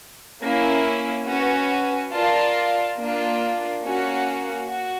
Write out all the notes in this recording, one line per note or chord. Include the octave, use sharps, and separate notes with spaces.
A#3 C#4 E4
C#4 F#4 B4
F4 A#4 D5 F5 A5
A#3 D4 F4
A#3 C#4 F#4
F#4